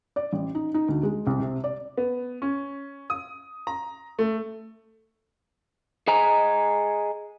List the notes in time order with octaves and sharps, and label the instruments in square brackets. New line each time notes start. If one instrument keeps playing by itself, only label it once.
[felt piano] D5
A1
D#4
D#4
D2
G#3
C2
C3
D5
[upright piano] B3
C#4
D#6
A#5
A3
[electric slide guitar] G#4 D#5 G#5 A#5